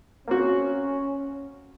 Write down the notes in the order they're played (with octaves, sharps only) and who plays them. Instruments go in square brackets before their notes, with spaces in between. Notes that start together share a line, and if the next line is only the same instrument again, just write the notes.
[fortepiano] A#3 C4 F#4 [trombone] C#4